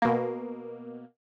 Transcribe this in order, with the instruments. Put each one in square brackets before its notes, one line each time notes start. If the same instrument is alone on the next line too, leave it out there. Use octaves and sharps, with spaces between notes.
[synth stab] B2 A#3